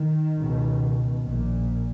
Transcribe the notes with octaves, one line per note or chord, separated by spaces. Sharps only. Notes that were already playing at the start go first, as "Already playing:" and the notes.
Already playing: D#3
C#2 B2
A#1 A#2